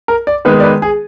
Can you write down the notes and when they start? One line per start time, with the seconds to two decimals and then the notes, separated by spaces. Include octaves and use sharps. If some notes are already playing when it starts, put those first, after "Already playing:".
0.08 A#4
0.27 D5
0.45 D#3 G#3 B3 B4
0.60 D5
0.64 B4
0.82 G#4